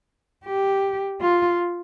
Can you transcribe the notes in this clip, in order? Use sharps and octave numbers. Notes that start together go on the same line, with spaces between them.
G4
F4